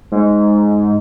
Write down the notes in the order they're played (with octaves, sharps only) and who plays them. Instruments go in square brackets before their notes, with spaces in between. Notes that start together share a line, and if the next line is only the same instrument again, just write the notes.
[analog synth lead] G#2